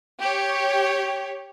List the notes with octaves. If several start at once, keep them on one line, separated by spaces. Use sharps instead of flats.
G4 C#5